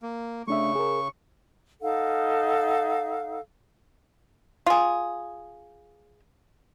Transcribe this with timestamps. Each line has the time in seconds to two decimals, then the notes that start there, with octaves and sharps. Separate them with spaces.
0.02 A#3
0.48 C#3 A3 D4 E5 C#6
0.75 G#4 A#4
1.82 D#4 A4 F5 F#5
4.66 F4 G#4